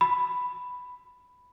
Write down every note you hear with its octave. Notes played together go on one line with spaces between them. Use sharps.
B5